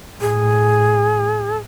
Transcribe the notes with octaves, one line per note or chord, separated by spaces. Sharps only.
A2 G#4